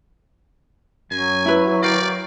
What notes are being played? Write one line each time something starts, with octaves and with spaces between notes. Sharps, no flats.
F#2 F#3 G#5
E4 B4
A#4 D5 F5 G5